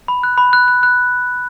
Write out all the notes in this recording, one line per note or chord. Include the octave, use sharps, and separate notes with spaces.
B5
F#6
B5
F#6
F#6
F#6